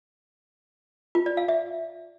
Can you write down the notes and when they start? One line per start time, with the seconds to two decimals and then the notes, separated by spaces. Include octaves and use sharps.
1.15 F4
1.26 D5
1.37 F5
1.48 E5